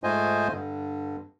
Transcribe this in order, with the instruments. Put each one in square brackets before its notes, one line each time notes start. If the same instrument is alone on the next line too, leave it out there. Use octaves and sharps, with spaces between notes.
[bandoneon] G#2 A3 F4 C5 D#5 G#5
G2 D3